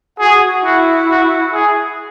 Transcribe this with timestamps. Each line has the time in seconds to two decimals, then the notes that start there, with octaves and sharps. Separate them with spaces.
0.19 F#4 G#4
0.64 E4 F#4
1.09 F#4
1.54 G#4